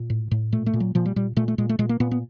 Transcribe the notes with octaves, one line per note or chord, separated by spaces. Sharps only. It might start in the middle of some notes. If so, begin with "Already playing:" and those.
Already playing: A#2
A2
A2
A#2 A3
A3
A#2
F#3
A#2 F3
G3
A#2 G3
A#2 A3
A3
A#2 G#3
A3
A#2 G#3
A#3
A#2 B3
B3